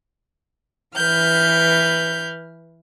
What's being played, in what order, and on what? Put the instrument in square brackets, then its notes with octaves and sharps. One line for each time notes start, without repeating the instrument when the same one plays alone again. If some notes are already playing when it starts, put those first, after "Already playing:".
[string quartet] E3 B4 F6 G6